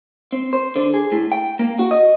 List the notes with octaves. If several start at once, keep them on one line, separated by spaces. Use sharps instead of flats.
C4
C5
D3
G#4
A2
G5
A#3
F#4
D#5